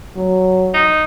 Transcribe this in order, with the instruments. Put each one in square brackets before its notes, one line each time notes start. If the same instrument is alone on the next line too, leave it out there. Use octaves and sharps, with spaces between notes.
[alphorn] F#3
[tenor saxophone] D#4